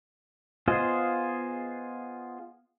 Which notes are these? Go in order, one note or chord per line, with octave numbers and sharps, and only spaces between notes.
B3 F4 G#4 C5 D#5